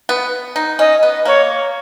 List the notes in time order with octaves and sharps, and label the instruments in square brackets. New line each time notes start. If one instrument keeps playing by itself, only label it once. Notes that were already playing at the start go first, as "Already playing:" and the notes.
[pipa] B3
D#4
[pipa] C#4 [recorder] D#5
[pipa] B3
[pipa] A#3 [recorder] C#5